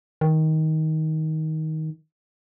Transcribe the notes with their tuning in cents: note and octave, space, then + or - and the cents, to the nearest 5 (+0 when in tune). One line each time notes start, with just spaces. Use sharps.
D#3 +15